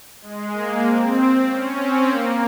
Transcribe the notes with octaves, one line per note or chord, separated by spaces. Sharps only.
G#3
A#3
C4
C#4
C4
A#3